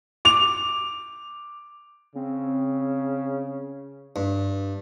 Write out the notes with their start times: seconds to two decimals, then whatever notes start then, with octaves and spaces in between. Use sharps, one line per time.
0.25 D6 F7
2.15 C#3 C4
4.16 G2